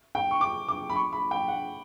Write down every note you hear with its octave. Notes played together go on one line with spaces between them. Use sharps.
G5
C#6
D6
D6
B5
C#6
B5
G5
F#5